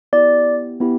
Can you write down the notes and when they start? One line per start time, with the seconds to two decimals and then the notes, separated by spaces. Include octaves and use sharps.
0.13 B3 E4 G4 D5
0.80 B3 E4 G4